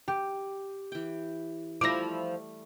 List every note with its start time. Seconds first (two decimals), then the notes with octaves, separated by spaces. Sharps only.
0.08 G4
0.92 E3 G5
1.81 F3 G3 A3 E4 D6 A#6